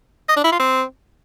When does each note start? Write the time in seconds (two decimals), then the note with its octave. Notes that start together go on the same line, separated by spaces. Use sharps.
0.29 D#5
0.37 D4
0.44 E4
0.52 F4
0.60 C4